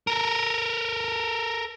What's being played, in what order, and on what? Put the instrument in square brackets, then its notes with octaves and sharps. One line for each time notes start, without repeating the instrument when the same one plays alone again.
[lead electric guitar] A4 A#4